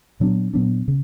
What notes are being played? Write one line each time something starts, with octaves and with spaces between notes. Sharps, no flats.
A#2 F#3 B3 D4
A#2 F#3 B3 D4
C#3